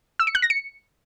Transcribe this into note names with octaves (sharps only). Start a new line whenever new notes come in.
E6
C#7
F#6
A#6
C#7